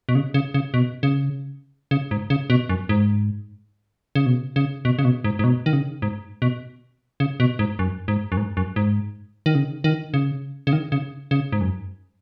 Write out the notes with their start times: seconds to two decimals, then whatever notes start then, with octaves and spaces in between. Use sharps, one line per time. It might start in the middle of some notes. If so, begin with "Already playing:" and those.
0.09 B2
0.15 C#3
0.34 C#3
0.54 C#3
0.74 B2
1.03 C#3
1.91 C#3
2.11 G#2
2.30 C#3
2.50 B2
2.69 F#2
2.89 G#2
4.15 C#3
4.26 B2
4.56 C#3
4.85 B2
4.99 C#3
5.05 B2
5.24 G#2
5.39 G#2
5.44 B2
5.66 D#3
5.73 C#3
6.02 G#2
6.42 B2
7.20 C#3
7.40 B2
7.59 G#2
7.79 F#2
8.08 G#2
8.32 F#2
8.37 G#2
8.57 F#2
8.76 G#2
9.46 D#3
9.55 C#3
9.84 D#3
10.14 C#3
10.67 C#3
10.73 D#3
10.92 C#3
11.31 C#3
11.52 G#2
11.61 F#2